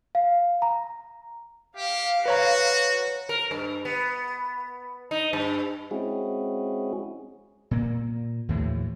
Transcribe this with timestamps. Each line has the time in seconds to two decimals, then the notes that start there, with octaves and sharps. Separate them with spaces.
0.15 F5
0.62 A#5
1.77 G4 F5
2.26 F#4 B4 C#5 A#5
3.29 A#4
3.51 G2
3.85 B3
5.11 D#4
5.33 G2
5.91 G#3 C4 C#4 E4 F#4 G#4
7.71 A#2 A#3
8.49 D#2 A2 E3 F3